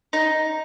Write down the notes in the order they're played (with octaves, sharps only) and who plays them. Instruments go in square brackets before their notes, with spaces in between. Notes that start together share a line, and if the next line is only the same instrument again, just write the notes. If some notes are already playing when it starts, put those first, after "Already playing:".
[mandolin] D#4